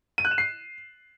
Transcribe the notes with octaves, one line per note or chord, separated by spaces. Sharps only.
D#7
F#6
E7
C7